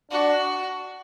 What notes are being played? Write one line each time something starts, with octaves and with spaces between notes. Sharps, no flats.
D4 F#4